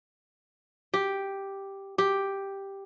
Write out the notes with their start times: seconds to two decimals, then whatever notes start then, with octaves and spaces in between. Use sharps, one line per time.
0.94 G4
1.98 G4